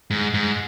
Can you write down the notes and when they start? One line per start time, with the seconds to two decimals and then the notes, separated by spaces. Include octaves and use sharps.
0.10 G#2
0.34 G#2